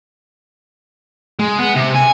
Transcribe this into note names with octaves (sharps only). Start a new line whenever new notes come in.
G#3
B3
C3
G#5